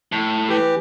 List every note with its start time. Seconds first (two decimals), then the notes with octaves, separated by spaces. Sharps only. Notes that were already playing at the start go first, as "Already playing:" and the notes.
0.12 A2
0.49 E3 G4